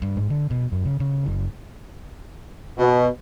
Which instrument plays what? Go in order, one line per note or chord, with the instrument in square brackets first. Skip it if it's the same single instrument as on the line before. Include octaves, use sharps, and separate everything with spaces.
[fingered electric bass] G2
G#2
D3
B2
F#2
C#3
C#3
F#1
[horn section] B2